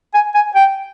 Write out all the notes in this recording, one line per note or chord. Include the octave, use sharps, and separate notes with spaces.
G#5
G#5
G5